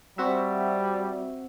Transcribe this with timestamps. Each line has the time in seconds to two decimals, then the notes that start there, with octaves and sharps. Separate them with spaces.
0.18 G3 C4 F#4 E5